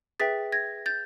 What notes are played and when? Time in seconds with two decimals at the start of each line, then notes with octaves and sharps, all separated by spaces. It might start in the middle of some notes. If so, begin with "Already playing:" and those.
0.20 G#4 B4 E5 G5 A6 B6
0.52 G#6 A#6
0.86 G6 A6